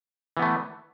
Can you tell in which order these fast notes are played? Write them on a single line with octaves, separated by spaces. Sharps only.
E3 B3 A3